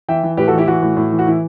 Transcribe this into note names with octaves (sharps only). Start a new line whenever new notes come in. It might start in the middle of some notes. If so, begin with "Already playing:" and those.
E3 E5 G5
E3
A2 G4 B4
F#4 A4
E3
E4 G4
E3 F#4
A2
A2
E3
F#4
E3 E4